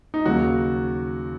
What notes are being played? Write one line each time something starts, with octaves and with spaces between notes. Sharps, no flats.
D#4
D#2 C#3 F#3 F#4